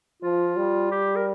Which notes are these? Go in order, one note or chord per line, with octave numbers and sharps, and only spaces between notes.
F3 F4
G3
G4
A#4